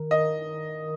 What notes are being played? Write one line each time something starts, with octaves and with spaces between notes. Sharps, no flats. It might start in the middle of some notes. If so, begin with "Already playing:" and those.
Already playing: D#3 A#4
D#5